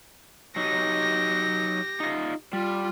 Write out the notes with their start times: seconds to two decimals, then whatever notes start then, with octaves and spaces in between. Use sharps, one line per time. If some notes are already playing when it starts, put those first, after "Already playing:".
0.56 F#3 D#4 G4 A#6
2.00 D#4 F4
2.53 G3 F4